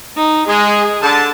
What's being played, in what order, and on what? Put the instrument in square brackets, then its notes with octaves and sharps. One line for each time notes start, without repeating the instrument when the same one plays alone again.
[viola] D#4
[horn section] G#3 [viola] G#4
[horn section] D3 A5